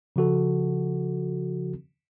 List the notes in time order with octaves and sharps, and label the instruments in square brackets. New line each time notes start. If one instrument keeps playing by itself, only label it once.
[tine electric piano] C#3 F3 F#4 A4